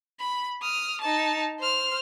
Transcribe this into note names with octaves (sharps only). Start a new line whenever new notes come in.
B5
D#6 F6
D#4 A5
C5 F6